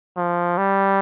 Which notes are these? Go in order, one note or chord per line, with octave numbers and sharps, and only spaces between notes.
F3
G3